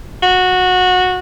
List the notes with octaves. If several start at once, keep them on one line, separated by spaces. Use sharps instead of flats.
F#4